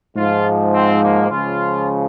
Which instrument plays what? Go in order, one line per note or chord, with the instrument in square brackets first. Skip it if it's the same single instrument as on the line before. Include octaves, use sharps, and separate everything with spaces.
[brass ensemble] G#2 F3 F4
C4
A#3
C#2 C#3 F3 F4